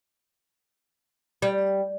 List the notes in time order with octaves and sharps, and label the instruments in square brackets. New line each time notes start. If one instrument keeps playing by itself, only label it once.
[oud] G3